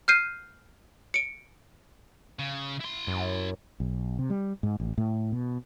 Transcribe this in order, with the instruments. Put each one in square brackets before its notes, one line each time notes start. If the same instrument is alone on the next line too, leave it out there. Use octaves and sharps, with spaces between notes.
[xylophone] F6 G6 C7 D#7
C#7 D7
[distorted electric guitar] C#3
E4 C6
[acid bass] F#2
[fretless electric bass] B1
C3
G3
G#2
A1
A2
B2